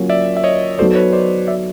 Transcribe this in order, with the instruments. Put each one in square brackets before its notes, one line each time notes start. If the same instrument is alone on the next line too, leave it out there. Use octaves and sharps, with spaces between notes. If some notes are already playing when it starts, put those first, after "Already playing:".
Already playing: [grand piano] F#3 A#3 C#4 F4
[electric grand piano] D5 E5
E5
C#5 D#5
[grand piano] F#3 B3 D#4 F#4 A4 [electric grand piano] C5 D5
[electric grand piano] B4 C#5
C5 D5
D5 E5